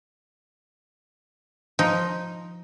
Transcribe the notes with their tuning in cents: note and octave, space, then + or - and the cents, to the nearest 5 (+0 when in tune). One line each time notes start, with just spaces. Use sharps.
F3 +0 D#4 +0